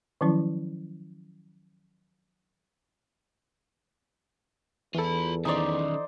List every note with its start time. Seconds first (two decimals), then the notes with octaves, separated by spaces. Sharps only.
0.21 D#3 F3 F#3 C#4 E4
4.95 E2 E3 F4 A4 B5
5.45 D#3 C#4 D#4 C5 D5